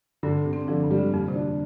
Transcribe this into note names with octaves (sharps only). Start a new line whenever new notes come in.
G2 D3
D3
C3
C4
D3 F3
G2
G3
D3
F2 A#3
C3
D4